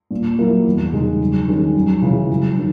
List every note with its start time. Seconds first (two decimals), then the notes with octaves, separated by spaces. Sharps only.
0.11 A#2
0.39 F#3 A#3 E4
0.66 E2
0.93 C#3 G#3 D#4
1.21 F#2
1.48 D#3 G#3 C#4
1.75 F#2
2.02 C#3 E3 G#3
2.30 F#2
2.57 D#3